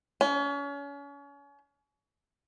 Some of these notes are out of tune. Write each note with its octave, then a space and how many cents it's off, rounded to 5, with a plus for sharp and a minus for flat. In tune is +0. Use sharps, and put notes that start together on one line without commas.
C#4 +35